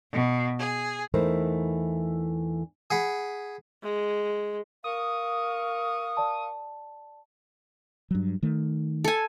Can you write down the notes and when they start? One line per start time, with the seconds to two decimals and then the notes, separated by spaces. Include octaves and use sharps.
0.11 B2
0.59 G#4
1.14 E2 E3 A3 D#4 A#4 C5
2.90 G#4 F#5 B5
3.83 G#3
4.84 A#4 F5 C#6 D#6
6.17 D5 A5
8.11 G2 F#3
8.43 D#3 A3
9.04 A4 G#5